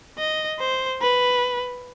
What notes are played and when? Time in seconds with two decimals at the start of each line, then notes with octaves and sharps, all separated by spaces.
0.18 D#5
0.59 C5
1.01 B4